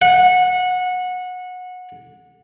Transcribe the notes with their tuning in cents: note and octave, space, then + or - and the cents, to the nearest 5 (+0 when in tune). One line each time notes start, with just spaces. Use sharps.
F#5 -20